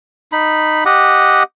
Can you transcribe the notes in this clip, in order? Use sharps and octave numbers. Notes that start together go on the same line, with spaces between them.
D#4 B5
G4 D#5 F#5